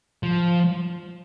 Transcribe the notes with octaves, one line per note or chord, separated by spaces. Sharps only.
F3